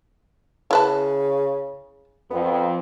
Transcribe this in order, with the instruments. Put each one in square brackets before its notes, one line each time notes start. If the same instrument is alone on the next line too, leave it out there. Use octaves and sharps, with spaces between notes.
[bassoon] C#3 [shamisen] E4 B4 A5
[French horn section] F2 [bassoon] B3